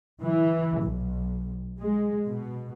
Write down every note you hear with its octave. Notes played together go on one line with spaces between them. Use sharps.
E3
B1
G#3
B2